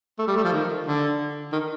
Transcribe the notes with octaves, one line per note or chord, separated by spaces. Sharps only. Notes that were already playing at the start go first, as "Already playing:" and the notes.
A3
G3
A3
F3
D#3
D3
D#3